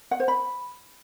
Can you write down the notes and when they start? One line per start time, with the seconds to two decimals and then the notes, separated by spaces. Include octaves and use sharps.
0.11 F#5
0.20 C5
0.28 B5